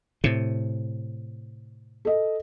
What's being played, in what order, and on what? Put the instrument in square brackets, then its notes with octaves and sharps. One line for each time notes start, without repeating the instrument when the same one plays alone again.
[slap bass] A2 C3
[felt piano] A4 D#5